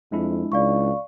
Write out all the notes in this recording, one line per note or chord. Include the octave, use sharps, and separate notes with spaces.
F2 G#3 D4 E4
C#2 D5 F5 C#6